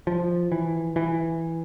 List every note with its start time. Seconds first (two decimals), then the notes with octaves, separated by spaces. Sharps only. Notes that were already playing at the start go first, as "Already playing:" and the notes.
0.07 F3
0.52 E3
0.96 E3